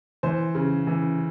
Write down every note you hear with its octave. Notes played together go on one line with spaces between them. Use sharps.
E3 C5
C#3
E3